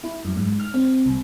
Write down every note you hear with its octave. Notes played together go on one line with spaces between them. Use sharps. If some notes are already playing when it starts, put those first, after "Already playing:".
E4
F#2
G#2
F6
C4
C2